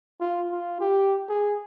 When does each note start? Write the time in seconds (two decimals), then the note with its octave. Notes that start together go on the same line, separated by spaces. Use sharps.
0.21 F4
0.51 F4
0.80 G4
1.29 G#4